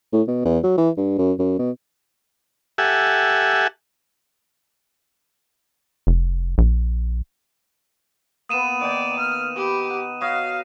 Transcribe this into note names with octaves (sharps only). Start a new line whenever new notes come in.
A2
B2
E2
F#3
E3
G2
F#2
F#2
B2
G4 A4 E5 F#5 G#5
F1
A#1
A#3 B3 D#6 D#7 E7
D#3 D5 G5
F6
G4 B5
F#5
F#4 C#5 D#5 F5